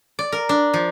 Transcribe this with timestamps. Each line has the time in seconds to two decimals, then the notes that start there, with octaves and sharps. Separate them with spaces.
0.19 D5
0.32 A#4
0.49 D4
0.74 F3